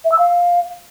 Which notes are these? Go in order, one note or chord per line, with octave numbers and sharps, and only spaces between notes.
E5
E6
F5